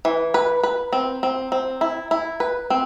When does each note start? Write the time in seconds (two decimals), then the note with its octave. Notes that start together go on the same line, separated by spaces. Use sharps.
0.05 E3
0.34 B4
0.63 B4
0.93 C4
1.23 C4
1.52 C4
1.81 E4
2.11 E4
2.40 B4
2.70 C4